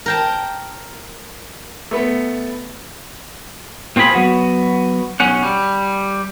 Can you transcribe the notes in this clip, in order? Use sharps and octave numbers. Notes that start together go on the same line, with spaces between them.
A#4 G5 A5
A3 B3
A#2 C4 F4 G#4 B5
F#3 B3 F#4
B1 C#4 F#5
G3